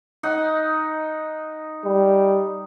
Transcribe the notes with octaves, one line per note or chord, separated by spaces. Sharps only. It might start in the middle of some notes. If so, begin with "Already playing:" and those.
D#4 F#5
G3